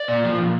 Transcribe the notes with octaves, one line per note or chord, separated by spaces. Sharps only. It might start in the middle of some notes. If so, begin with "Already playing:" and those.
Already playing: D5
A#2
F3
A#2